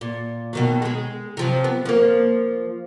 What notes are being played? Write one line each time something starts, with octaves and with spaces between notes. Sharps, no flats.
A#2
B2 D#3 F#3
G#3 G#4
C3 F3 F#3
B3
F3 A#3